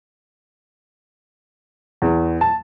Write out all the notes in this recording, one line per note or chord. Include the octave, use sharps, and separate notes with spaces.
E2
A5